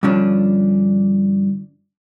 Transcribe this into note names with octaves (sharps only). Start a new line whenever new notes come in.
G2 D3 F3 C#4 D4